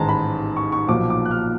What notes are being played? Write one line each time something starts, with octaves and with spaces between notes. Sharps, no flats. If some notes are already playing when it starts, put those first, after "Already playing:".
Already playing: A1 G#2 D#3 G#3 A5 A#5
B5
C#6
C#6
B1 A#2 F3 D6
D6
F#6
F6